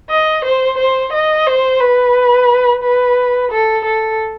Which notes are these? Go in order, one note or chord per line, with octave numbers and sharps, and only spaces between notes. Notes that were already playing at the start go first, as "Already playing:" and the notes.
D#5
C5
C5
D#5
C5
B4
B4
A4
A4